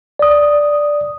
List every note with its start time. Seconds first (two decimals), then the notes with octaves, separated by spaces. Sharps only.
0.19 D5 D#6